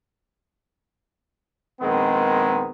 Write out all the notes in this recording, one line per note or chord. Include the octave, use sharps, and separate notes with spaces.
A#1 D#3 G#3 B3 C4